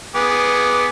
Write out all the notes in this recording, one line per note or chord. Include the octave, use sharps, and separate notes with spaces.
B3 G#4 D6